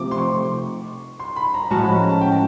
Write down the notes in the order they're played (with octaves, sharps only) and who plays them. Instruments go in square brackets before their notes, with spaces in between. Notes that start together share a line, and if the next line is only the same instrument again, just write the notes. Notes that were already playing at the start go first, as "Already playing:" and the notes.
Already playing: [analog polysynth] C3 F3 A3 C4 [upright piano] D6
[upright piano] C6
C#6
C6
B5
A#5
[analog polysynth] A2 F3 G#3 C#4 F#4 [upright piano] A5
[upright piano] B5
A#5
A5
G5
A5